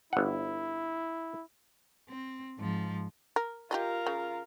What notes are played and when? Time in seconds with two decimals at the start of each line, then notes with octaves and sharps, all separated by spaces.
0.13 G1 E4 F#5
2.09 C4
2.58 G#2 F3
3.36 A#4
3.71 F4 G4 G#4 A#4 D#5
4.07 C#3